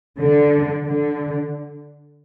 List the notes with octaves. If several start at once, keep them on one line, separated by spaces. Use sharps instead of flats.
D3
D3